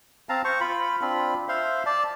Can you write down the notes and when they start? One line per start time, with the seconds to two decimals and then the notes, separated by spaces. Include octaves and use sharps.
0.29 C4 F5 A5 A#5
0.45 C5 C#6
0.61 F4 B5
1.01 C4 D4 F4 B5
1.49 C5 E5 F5 C6
1.86 D5 A5